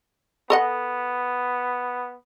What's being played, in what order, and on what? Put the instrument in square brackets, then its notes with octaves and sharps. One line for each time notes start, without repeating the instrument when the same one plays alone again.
[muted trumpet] B3 [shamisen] A4 D#5 F#5